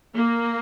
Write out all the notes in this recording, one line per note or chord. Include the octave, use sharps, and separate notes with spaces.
A#3